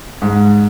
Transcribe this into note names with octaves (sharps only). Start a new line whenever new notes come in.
G#2